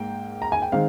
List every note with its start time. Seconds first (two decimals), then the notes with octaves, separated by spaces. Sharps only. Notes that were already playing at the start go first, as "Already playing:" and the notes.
Already playing: G#2 A#3 G5
0.42 A#5
0.52 G#5
0.62 G5
0.72 D#3 G#3 C4 F5